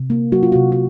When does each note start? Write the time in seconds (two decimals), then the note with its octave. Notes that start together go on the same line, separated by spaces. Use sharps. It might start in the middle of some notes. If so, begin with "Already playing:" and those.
Already playing: C3
0.10 A#3
0.32 F#3 F#4
0.43 F4
0.52 F#4
0.56 C3
0.72 F#4